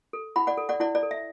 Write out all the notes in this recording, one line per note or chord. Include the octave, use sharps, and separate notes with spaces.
A4
E4 F#5 B5
D5 F#5
A4
D5 F#5
E4 D5 F#5
D5
A4
E5